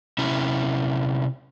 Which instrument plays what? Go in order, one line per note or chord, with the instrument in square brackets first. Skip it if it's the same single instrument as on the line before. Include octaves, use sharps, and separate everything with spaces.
[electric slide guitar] C3 C#4 E4